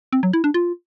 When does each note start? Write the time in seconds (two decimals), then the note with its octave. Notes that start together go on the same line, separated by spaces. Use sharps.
0.13 C4
0.23 F#3
0.33 E4
0.44 D4
0.54 F4